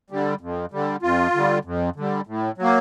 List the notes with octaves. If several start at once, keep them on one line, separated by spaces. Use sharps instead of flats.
D3 G3
F2
D3 G3
F2 F4
D3 G3
F2
D3 G3
A2
F#3 A#3